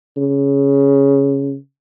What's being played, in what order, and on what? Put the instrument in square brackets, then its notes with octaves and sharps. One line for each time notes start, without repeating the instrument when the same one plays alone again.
[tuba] C#3